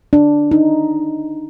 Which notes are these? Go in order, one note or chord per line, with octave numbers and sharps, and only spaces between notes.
D4
D#4